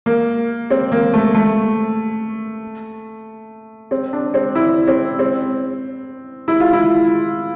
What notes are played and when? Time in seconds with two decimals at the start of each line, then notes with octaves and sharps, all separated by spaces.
0.06 A#3
0.70 C4
0.92 A#3
1.13 A3
1.34 A3
3.91 C4
4.13 D4
4.34 C4
4.55 E4
4.87 C4
5.19 C4
6.48 E4
6.60 F4
6.73 E4